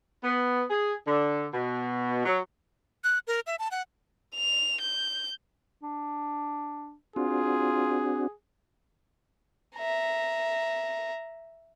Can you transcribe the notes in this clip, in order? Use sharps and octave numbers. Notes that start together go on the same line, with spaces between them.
B3
G#4
D3
B2
F#3
F#6
A#4
E5
A5
F#5
F7
G6
D4
C4 D4 F4 F#4 G#4
E5 A#5